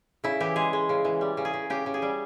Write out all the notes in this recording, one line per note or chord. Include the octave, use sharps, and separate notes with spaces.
C#3 E4
E3 G4
G#3 G#4
G#3
C#3
E3
G3
C#3
G#4
C#3
C#3 G4
C#3
G#4
G3